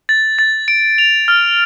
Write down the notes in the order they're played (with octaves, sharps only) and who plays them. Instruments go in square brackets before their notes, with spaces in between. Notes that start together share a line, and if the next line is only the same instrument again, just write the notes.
[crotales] A6
A6
D7
F7
F6